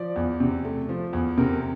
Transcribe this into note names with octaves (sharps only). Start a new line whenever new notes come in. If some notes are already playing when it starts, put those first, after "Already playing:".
Already playing: F3 D5
E2
C3
A3
F3
E2
C3 A#4